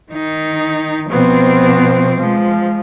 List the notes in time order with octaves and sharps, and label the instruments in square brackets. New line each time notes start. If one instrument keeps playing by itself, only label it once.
[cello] D#3 D#4
[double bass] B2 B3 [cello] F3 C4
[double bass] F3 [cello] G#3